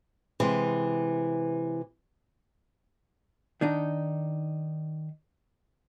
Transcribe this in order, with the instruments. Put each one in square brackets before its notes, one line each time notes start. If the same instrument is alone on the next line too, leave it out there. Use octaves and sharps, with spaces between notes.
[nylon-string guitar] C3 E3 G#3
[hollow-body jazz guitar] D#3 D4 D#4